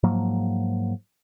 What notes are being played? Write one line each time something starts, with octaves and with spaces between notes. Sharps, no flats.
G#2 F3 F#3 A#3